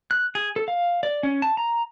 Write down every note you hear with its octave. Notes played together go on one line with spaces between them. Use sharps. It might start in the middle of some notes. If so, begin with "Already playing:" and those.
F#6
G#4
A4
F5
D5
C#4
A5
A#5